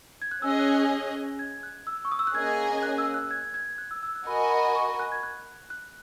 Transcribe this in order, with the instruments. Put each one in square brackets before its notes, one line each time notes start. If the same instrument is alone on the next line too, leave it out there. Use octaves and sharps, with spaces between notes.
[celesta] G#6
F#6
[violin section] C#4 G#4 D#5 [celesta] E6
[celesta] F#6
F#6
G#6
F#6
E6
C#6
D#6
E6
F#6
[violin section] A#3 C#4 G#4 D#5 G#5 [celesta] G#6
[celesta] F#6
E6
F#6
G#6
G#6
F#6
E6
E6
F#6
[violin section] F#4 A#4 D#5 G#5 [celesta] B5
[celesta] B5
C#6
F#6
G#6
F#6
F#6